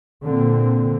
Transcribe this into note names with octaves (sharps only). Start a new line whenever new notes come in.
A#2 D3 C4